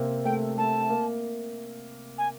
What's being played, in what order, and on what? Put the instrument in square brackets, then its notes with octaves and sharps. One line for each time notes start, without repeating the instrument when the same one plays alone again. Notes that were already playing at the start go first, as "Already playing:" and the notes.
Already playing: [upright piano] C3 A#3 C4
[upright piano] A3 [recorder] G5
[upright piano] A3 [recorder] A5
[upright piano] A#3
[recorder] G#5